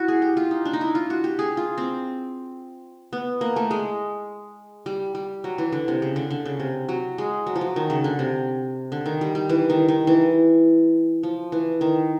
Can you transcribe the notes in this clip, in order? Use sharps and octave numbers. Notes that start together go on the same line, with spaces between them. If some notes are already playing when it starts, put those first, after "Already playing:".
Already playing: E4 F#4
G#4
G4
F4
D#4
D4
D#4
E4
F4
F#4
G4
G#4
F4
C4
B3
A#3
A3
G#3
G3
G3
F#3
E3
D3
C3
C#3
D3
D3
C#3
C3
F#3
G#3
F#3
F3
F#3
D#3
C#3
D3
C3
D3
D#3
G3
G3
E3
D#3
D#3
E3
F3
E3
D#3